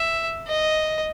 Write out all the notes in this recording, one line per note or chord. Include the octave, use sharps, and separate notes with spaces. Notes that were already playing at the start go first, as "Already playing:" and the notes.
Already playing: E5
D#5